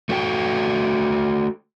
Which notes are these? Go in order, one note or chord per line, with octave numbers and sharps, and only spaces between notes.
A3 F#4 A4 G5